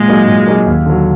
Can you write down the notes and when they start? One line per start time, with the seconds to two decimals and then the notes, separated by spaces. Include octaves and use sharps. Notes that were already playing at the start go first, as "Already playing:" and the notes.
Already playing: A#2 G#3
0.08 F#3 A#3 D#4 G#4
0.27 A#2
0.47 F#3 A#3 D#4 G#4
0.66 D#2
0.85 D3 F#3